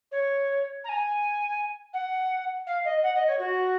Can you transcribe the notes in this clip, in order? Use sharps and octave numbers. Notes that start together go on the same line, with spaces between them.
C#5
A#5
G#5
F#5
F5
D#5
F#5
D#5
C#5
F#4